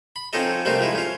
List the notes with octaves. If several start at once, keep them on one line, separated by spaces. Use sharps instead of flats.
B5
F3 C4 C#4 D#4 A4 D#5
C3 G3 A3 A#3 C4 D#4
F3 G#3 D#4 E4
C#4 F4